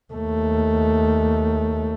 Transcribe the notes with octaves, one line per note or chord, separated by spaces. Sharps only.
D#2 A3